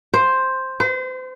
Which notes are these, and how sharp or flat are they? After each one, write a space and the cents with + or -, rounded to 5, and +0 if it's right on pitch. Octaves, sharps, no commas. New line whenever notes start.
C5 +5
C5 -35